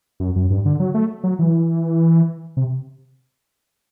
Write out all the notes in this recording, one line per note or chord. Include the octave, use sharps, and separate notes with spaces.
F#2
F#2
G2
D3
F#3
A3
F#3
E3
C3